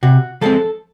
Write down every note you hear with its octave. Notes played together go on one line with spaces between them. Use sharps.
C3 F#4
F3 G#3 C4 A4